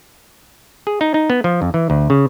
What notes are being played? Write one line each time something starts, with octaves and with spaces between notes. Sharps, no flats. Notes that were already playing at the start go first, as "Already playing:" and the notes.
G#4
D#4
D#4
B3
F3
F2
E3
D2
C#3